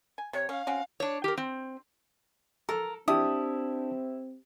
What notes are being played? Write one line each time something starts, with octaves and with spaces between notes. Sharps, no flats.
G#5
C3 C#5
C#4 F5
C4 C#4 F#4
D4 C#5
G4 A#4
C4
A4 A#4
C4 D4 E4 G4 A5 D#6